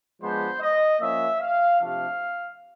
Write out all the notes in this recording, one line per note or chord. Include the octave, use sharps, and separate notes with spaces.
F3 G#3 B3 D4 C5
D#5
F3 A#3 C#4 E5
F5
C3 F3 A3 D4 F5